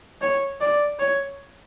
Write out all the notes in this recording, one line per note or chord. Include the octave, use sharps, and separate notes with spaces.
C#5
D5
C#5